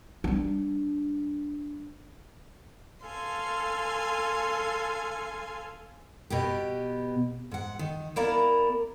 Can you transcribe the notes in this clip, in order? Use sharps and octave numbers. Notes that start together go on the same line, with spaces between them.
G3 D4
A4 F5 G#5 C6
B2 B3 G4
G#2 F#5
D#3
A#3 B3 E4 A#4 D5 A#5